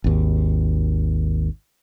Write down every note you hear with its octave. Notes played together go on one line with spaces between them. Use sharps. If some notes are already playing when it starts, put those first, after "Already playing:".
G#1 D#2